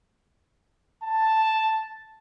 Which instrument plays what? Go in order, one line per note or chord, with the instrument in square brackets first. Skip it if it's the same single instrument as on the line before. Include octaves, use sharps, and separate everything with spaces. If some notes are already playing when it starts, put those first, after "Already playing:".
[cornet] A5